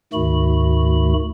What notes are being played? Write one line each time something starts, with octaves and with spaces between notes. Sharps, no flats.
D2 G#2 D#3 A3 F#4 B5